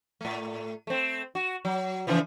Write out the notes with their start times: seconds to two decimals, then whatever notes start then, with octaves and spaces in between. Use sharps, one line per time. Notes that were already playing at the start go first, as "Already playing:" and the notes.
0.21 A2 A3
0.87 A3 C4
1.35 F#4
1.65 F#3
2.07 C#3 E3 F3